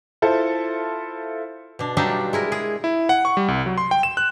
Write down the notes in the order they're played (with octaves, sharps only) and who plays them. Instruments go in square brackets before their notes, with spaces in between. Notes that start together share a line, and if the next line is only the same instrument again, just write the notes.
[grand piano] E4 F4 A4 C5
[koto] B2 D4
F#3 G3 D4 D#4 F4 E5
G#3 E4 A#4
G#4
[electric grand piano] E4
F#5
C#6
G3
C2
F#3
C6
G5
E7
F#6